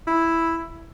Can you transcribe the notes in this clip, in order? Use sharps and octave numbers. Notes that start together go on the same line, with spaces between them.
E4